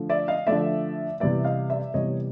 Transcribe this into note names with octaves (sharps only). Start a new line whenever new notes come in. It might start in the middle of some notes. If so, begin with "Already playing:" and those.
Already playing: D3 F3 A3
D5 E5
D#5 F5
D3 F3 A3 D5 E5
C3 E3 G3 B3 D5 E5
D#5 F5
D5 E5
C3 E3 G3 B3 C#5 D#5